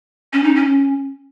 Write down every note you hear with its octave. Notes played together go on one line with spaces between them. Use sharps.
C#4
D#4
C#4